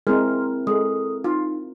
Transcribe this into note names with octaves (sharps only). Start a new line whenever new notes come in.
G#3 C4 E4 A#4 C6 F6
G#3 A4 D#6
D#4 F4